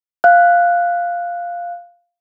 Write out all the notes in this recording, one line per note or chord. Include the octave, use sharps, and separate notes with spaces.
F5 F#6